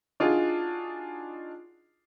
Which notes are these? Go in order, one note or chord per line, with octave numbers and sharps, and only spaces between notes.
D4 D#4 F4 F#4 G#4